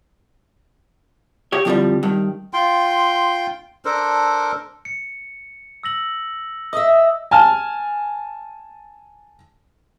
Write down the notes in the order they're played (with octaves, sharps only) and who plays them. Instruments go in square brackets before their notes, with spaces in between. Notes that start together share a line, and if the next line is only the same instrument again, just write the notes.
[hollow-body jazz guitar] G4 C#5
F2 A2 D3 D#3 F3 G3
G2 D#3
[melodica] F4 G5 C6
D4 A4 A#4 C5
[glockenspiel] C#7
E6 A#6 F#7
[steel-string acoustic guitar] D#5 E5 [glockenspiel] D#6 E6
[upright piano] G#5 A5 F6